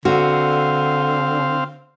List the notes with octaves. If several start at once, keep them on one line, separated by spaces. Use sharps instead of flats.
D3 C4 F#4 F5